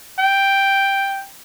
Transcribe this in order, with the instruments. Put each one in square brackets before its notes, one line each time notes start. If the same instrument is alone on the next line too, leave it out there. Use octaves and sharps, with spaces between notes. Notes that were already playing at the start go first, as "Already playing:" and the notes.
[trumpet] G5